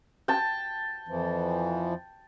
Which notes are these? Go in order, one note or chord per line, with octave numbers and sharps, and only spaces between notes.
G5 A5
F2 E3 F3